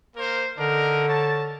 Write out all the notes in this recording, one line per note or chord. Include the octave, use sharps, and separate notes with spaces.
A#3 A#4 C5
D3 D4 D#4 A#4
C#5 A5